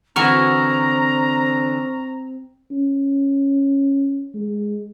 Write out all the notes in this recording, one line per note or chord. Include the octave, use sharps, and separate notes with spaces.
D3 E3 C4 F#4 A#5 C#6 F6
C#4
G#3